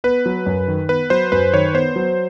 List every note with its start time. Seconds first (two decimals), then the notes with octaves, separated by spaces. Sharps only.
0.04 B3 B4
0.26 F#3
0.46 F#2
0.68 D#3
0.89 B3 B4
1.10 F#3 C5
1.32 F#2 B4
1.53 D#3 C#5
1.74 B3 C5
1.96 F#3